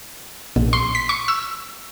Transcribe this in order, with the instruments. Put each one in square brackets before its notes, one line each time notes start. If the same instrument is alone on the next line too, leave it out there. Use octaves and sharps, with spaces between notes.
[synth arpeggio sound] A#1
C6
B6
C#6
E6